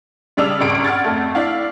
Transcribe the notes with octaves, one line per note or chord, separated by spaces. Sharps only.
C#3 G3 D4 D#6 E6 F7
G#1 C#2 G2 D7
F#5 F6 G#6 A6
F2 A3
D4 E4 F5